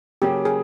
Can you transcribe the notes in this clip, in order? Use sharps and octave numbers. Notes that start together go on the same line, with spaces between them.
C#3 F#3 A#3 C#4 G4
G#4